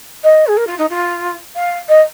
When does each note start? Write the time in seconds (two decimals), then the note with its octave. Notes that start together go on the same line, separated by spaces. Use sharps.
0.24 D#5
0.47 G#4
0.57 A#4
0.67 F4
0.78 D#4
0.90 F4
1.56 F5
1.89 D#5